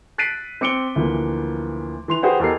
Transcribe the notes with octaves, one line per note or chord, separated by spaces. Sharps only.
F#6 A6 B6 C7 D7 D#7
C4 D6 C#7 D7 G7
D2 E3 F3 A#3
E3 C6 F7
F#4 G#4 B4 C5 F#5 G5
E2 G4 A4 A#4 D#5 C7